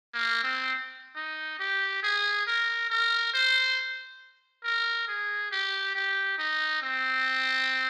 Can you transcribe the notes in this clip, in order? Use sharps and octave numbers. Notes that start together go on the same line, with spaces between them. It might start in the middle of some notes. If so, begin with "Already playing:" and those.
A#3
C4
D#4
G4
G#4
A#4
A#4
C5
A#4
G#4
G4
G4
D#4
C4